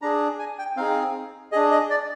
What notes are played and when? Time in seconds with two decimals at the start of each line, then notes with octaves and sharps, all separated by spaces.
0.02 D4 G#4 A#5
0.39 G#5
0.59 G5
0.77 C4 D#4 G#4 F5
1.52 D4 G#4 D#5
1.71 D#5
1.90 D5